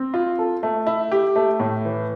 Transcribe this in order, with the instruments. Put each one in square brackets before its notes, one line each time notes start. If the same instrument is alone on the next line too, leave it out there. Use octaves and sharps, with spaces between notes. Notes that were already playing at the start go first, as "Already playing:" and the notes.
Already playing: [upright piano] C4
F4
A4
A3
E4
G4
A3
A2
E3